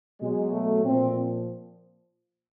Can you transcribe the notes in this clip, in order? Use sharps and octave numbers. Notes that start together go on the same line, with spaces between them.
B2 F#3 G#3
A3
A#2 F3 C4